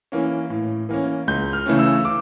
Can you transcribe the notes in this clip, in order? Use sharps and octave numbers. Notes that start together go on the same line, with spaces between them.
E3 A#3 C#4
A2
E3 A#3 C#4
C#2 G6
F6
C#3 E3 A3 C#4
E6
D6